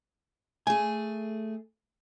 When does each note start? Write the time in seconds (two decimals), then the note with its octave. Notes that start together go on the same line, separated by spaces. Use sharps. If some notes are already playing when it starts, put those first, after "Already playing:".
0.67 A3 G#4 G#5